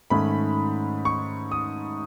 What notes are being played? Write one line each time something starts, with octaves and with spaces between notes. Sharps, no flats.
G#2 D#3 A3 C#4 B5
C#6
D#6